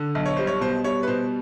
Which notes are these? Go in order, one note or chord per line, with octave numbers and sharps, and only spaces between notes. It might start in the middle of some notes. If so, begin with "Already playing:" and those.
Already playing: D3
B1
C#5
G3 C5
C#5
B2 C5
G3 C#5
B4
B2 C5